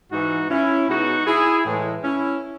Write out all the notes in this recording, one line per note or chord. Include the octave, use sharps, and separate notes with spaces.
G#2 E3 G#3 D#4 F#4
C#4 E4
B2 G#3 B3 D#4 F#4
E4 G#4
A2 E3 G#3
C#4 E4